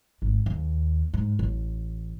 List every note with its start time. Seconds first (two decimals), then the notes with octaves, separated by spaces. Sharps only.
0.22 G#1
0.46 D#2
1.14 G#2
1.39 A1